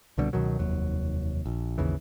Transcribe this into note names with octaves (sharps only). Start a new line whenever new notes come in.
C2 B2 D3 G3
C#2 B2 D#3 F#3
F1 D#2 F#3
A#1
G#1 D#2 C#3 E3